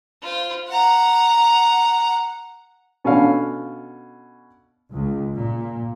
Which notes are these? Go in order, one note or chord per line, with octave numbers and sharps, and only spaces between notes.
F4 C5
F#5 A#5
B2 C#4 D4 A4 F5
C#2
A#2